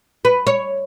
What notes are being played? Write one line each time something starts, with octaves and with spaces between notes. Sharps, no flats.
B4
C#5